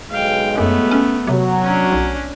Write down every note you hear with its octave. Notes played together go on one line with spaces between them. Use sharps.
B1 G#3 F5 G5
F#2 A3 B3
C#4
C3 F#3
C#4 D4
B1